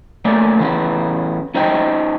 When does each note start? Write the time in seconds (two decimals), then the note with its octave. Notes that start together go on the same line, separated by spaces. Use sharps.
0.25 A3 A#3 C#4 D5
0.60 E3 B3 C#4
1.55 C#4 D#4 C5 D#5 G5